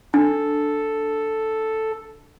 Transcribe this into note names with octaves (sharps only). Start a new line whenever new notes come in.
D4 A4